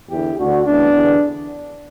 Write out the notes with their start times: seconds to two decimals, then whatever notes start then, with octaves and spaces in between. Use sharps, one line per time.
0.10 E2 D3 E4 G4
0.38 D2 D3 D4 F#4
0.66 D2 C#3 E3 B3 D4
0.94 E2 D3